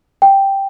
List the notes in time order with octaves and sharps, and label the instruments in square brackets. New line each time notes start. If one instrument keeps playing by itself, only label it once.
[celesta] G5